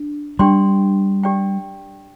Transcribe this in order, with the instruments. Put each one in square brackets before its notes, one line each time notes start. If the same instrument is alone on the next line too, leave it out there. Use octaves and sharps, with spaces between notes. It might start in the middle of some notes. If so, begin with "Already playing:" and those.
Already playing: [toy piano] D4
[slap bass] G3 [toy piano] D4 G4 D5 G5 C6
[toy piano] G4 D5 G5